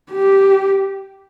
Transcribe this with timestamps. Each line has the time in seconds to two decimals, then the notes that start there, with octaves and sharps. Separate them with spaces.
0.12 G4